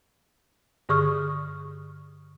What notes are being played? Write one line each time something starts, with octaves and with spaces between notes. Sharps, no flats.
G2 D3 G#4 C#6 D#6 F6